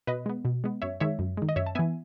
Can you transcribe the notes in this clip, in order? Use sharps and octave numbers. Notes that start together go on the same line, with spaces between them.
B2 B4 D#5
G#3 B3
B2
G#3 B3
F#2 C#5 E5
D#3 G#3 C#5 E5
F#2
D#3 G#3
D#5
F#2 C#5 E5
A5
E3 B3 E5 G#5